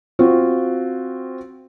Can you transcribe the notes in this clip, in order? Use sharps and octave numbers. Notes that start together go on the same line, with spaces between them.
C4 F4 F#4